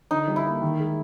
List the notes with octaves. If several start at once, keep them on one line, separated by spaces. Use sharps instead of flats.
D3 D#4
G3
E4
A#3
D#3
G#3